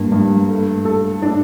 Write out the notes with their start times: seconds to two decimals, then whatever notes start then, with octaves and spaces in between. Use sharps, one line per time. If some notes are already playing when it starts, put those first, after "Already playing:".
Already playing: G2 A#3
0.12 G2
0.49 A3
0.85 A4
1.22 D4